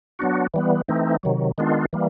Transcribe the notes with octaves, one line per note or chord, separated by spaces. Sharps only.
F#3 B3 D4 F#4
E3 G3 B3
E3 A3 C4 D#4
C3 D#3 F#3
D#3 G#3 B3 D4 F4
E3 G3 A#3